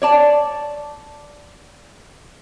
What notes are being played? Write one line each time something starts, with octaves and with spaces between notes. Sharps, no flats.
C#5 D5 A5